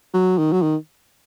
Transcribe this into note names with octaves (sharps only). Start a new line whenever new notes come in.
F#3
D#3
F#3
D#3